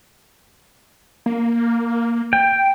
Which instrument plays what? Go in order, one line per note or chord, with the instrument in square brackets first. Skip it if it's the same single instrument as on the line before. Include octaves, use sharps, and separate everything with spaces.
[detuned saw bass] A#3
[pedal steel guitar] G5